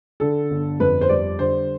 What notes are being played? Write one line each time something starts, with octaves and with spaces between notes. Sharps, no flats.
D3 A4
G1
F2 B4
C5
G3 D5
D3 C5